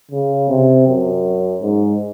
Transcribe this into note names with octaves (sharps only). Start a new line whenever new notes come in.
C#3
C3
F#2
G#2